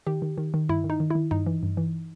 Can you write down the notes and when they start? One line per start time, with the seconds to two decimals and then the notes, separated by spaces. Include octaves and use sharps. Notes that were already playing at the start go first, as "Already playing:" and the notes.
0.07 D#3 G4
0.22 D#3
0.38 D#3
0.54 D#3
0.69 G2 E4
0.84 D#3
0.90 D#4
1.00 D#3
1.10 D#3 E4
1.31 G2 D#4
1.46 E3
1.63 G2
1.77 E3